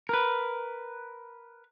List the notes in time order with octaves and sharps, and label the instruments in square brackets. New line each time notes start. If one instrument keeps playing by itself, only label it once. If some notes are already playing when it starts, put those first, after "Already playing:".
[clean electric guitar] A#4 B4